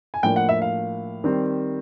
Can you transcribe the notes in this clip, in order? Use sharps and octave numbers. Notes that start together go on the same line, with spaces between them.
G#5
A2 F3 A#3 D4 G5
F#5
E5
F5
D#3 G3 C4